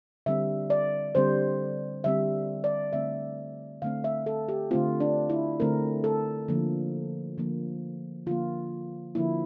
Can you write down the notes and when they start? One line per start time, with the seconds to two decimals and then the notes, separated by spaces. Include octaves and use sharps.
0.26 D3 G3 C4 E5
0.70 D5
1.15 D3 G3 C4 C5
2.04 D3 G3 C4 E5
2.64 D5
2.93 D3 A3 C4 E5
3.82 D3 A3 C4 F5
4.04 E5
4.26 A4
4.49 G4
4.71 D3 A3 C4 F4
5.00 D4
5.30 E4
5.60 D3 A3 C4 A#4
6.04 A4
6.48 D3 F3 A#3
7.38 D3 F3 A#3
8.26 D3 F3 A#3 F4
9.15 D3 F3 A#3 E4